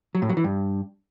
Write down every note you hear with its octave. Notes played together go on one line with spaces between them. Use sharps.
F#3
A2
F#3
E3
G2